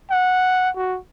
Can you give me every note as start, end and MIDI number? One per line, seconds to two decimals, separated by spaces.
0.10 0.70 78
0.76 0.99 66